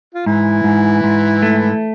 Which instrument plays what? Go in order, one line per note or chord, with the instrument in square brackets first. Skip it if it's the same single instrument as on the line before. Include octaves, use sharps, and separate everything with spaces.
[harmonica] F4
[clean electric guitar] G#2 [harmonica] E3 E4
[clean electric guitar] G#2
G#2
A3